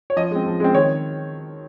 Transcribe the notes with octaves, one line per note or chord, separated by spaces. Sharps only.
C#5
F3 D#5
G#3 C4
F3
G#3 C4
D#3 C#5